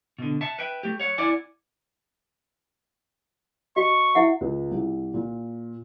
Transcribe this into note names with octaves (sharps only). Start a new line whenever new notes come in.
B2 D3
E5 F#5 A5
B4 E5 G5
A3 G4
C#5 F#5
E4 D5 F#5 G#5
F#4 D#5 C#6
E4 E5 F#5
C#2
C2
A#2